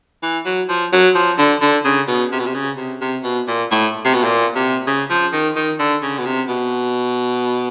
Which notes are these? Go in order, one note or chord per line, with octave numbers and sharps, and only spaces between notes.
E3
F#3
F3
F#3
F3
D3
D3
C#3
B2
C3
B2
C3
C#3
C3
C3
B2
A#2
A2
C3
B2
A#2
C3
C#3
F3
D#3
D#3
D3
C#3
B2
C3
B2